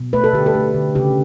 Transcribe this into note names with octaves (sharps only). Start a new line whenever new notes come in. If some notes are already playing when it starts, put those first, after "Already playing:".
Already playing: B2
A3 B4
A4
D3 G4
A4
A3
D3
C#3 G4